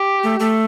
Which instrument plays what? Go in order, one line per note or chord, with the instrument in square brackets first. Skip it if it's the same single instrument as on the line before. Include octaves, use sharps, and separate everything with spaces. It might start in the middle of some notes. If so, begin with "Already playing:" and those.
Already playing: [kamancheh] G4
[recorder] A3
A3